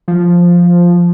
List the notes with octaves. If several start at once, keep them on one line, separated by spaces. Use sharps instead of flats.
F3